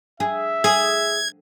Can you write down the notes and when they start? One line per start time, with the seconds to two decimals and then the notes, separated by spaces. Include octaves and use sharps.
0.20 G#4 E5
0.64 G#4 G#6